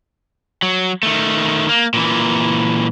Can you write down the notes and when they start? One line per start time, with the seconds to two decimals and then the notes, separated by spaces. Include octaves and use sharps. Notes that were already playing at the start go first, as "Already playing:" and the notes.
0.62 F#3
1.03 D#3 A3
1.69 A#3
1.94 A#2 E3